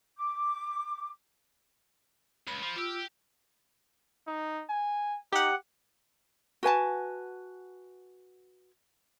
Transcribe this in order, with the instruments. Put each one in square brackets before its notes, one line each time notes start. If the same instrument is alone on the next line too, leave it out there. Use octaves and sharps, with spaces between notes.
[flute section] D6
[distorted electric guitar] C#2 [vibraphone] B5
[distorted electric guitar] F3
[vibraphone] F4 E6 [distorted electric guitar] G4
[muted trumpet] D#4
G#5
[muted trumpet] D#4 [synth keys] G4 F#5
[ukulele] F#4 B4 G#5 A5